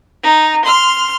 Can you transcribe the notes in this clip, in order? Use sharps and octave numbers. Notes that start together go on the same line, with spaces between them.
D#4
C6 F6